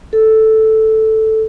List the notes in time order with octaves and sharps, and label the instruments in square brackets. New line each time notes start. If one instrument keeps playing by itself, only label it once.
[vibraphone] A4